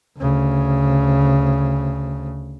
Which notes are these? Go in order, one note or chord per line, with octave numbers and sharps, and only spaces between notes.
D2 C#3